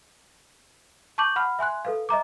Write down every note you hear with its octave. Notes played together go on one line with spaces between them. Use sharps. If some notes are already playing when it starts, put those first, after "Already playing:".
A5 C#6 D6 G6 F#7
F#5 B5 F6
E5 G#5 C6 F#6
A4 B4 F5
D#5 E5 A#5 D6